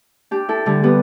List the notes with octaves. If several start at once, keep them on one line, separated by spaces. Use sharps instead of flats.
D4 G4
E4 A4
D3 G3
G3 B3